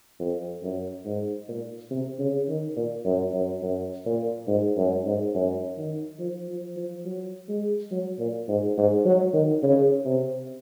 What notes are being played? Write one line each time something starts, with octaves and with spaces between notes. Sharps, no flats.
F2
F#2
G#2
A#2
C3
C#3
D#3
A#2
F#2
F#2
F#2
A#2
G#2
F#2
G#2
F#2
D#3
F3
F3
F3
F#3
G#3
F#3
A#2
G#2
G#2
F#3
D#3
C#3
C3